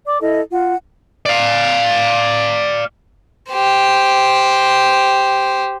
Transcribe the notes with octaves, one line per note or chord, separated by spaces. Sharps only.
D5 D6
E4 A4 D#5
F4 F#5
D5 F5
G4 C5